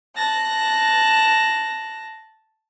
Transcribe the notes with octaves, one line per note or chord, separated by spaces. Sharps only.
A5 F#6 A#6